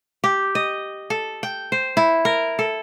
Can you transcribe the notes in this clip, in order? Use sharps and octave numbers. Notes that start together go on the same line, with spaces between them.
G4
D#5
A4
G5
C5
E4
A#4
A4